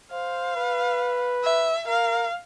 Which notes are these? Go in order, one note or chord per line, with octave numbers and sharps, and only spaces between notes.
C5 F5
B4
E5
A#4 F5